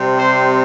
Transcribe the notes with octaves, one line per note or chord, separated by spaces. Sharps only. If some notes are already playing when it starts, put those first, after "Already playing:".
Already playing: C3 G3 C4
C5